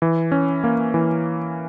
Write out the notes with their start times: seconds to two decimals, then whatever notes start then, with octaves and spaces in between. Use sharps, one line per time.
0.02 E3
0.32 C#4
0.64 A#3
0.94 E3